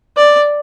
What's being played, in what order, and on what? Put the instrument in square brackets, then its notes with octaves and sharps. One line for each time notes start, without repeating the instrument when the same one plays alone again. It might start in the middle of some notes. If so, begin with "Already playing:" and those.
[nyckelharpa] D5